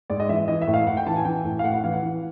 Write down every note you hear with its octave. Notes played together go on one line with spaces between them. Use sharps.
G#2 D5
D#5
E3 E5
E3 D#5
E5
A2
F5
A2 F#5
G5
E3 A5
G#5
E3 G5
A2
F5
A2 F#5
F#5
E3 F5
F#5
E3